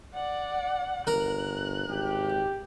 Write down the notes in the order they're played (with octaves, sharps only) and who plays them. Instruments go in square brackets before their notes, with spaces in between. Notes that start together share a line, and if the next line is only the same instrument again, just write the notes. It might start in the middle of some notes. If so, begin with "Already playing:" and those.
[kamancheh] D5 F#5
[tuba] G1 [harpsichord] A#4 [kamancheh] F#6
[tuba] G#1 [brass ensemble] G4